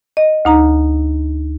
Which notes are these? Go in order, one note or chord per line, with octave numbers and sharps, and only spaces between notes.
D#5
D2 D#4 A#5